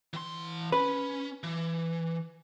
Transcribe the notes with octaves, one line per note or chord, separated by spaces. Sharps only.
E3 C6
C#4 B4
E3